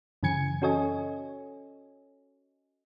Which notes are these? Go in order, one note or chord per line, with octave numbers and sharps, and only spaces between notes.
F#2 C#3 E3 G#5 G#6 C#7
C#4 F#4 A4 C#5 D#5 G#5